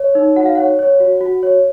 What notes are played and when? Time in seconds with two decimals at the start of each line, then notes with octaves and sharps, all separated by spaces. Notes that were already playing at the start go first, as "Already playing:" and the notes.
Already playing: C#5
0.15 D#4
0.36 F#4 F#5
0.46 F5
0.55 C#5 F#5
0.79 C#5
1.00 F#4
1.21 F#4
1.43 C#5